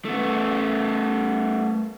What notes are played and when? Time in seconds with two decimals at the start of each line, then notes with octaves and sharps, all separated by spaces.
0.05 A3 B3